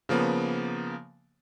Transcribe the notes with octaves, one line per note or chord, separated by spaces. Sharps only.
C#3 F3 A#3 B3